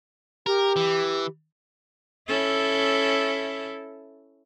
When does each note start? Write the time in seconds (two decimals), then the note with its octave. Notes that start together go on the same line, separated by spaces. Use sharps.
0.46 G4 A#4
0.76 E3
2.28 C#4 E4 A4